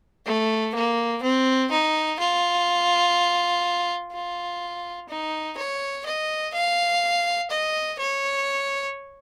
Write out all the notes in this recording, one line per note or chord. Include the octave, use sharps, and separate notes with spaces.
A3
A#3
C4
D#4
F4
F4
D#4
C#5
D#5
F5
D#5
C#5